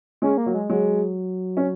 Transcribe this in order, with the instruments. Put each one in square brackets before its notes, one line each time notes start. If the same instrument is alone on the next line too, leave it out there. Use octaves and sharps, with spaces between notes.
[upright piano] G#3 [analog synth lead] C#4
[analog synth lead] A#3
[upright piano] F#3
[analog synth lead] G#3
[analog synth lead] F#3 [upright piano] G#3
[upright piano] C#4